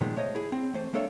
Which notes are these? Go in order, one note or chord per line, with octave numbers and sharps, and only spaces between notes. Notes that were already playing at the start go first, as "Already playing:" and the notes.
A#2 D#3 F3 G#3 B3
A3 C5 C#5 D#5
E4 G#4
C4
E3 A3 C5
G#3 A#3 D4 A4 C#5 E5